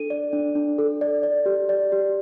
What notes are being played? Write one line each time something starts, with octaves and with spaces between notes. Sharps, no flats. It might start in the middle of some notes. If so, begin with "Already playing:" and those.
Already playing: D4 A4 D#7
D5
D4
D4
A4
D5
D5
G4
D5
G4